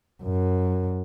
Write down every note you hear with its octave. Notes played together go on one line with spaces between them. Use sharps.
F#2